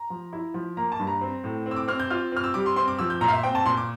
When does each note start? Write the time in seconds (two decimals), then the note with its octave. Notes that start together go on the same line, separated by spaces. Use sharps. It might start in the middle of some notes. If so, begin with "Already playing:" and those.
Already playing: A#5
0.10 F3
0.33 E4
0.54 F3
0.77 A#3 A#5
0.92 A5
0.99 G2
1.07 A#5
1.21 C4
1.44 A2
1.66 C4
1.71 E6
1.76 D6
1.88 C4 F6
2.00 G6
2.10 F4 F6
2.32 C4 F6
2.44 E6
2.54 G3 D6
2.66 C6
2.76 C4 C6
2.88 D6
2.99 F3 E6
3.10 G6
3.21 A#2 A#5
3.28 F5
3.32 E5
3.44 C4 G5
3.55 A5
3.66 A#2 C6
3.77 D6